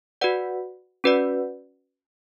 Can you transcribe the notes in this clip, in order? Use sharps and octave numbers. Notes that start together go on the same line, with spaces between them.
F#4 B4 D5 F#5
C#4 F#4 B4 D5 F#5